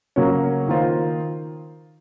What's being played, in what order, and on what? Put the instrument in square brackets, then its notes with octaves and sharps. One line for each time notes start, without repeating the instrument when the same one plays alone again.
[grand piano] C#3 F#3 A#3 C#4
D#3 A#3 F4 C5